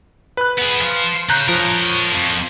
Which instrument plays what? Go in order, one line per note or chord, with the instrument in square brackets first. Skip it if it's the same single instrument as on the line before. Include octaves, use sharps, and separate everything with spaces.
[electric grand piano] B4 F#6
[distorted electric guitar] B3 G#4
C5 F5
[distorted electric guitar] C#3 [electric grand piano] A#5 F#6 G6
[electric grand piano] F3 [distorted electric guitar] A#4 C#5
[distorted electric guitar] F2